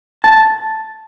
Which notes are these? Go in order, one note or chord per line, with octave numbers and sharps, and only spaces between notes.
A5